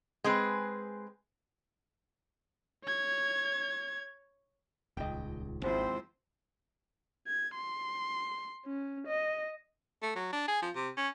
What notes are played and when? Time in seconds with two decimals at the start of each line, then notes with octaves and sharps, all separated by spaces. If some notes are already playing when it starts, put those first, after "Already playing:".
0.24 G#3 C4 G#4 B4
2.85 C#5 G#6
4.97 D#1 C#2 D#5 G5
5.63 G#1 D#2 G#2 F3 C4 E4 C5
7.27 G#6
7.56 C6
8.66 C#4
9.07 D#5
10.02 A3
10.16 F#3
10.33 D4
10.48 G#4
10.62 F3
10.75 C3
10.97 C#4